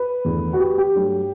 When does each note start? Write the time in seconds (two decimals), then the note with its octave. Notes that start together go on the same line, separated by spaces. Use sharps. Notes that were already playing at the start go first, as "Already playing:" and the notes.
Already playing: B4
0.25 E2 D3 A3
0.53 F#4
0.59 G4
0.78 G4
0.95 G2 F#3 A3